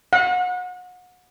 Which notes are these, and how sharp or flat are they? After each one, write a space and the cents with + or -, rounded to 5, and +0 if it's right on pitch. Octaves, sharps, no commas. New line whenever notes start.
F#5 -30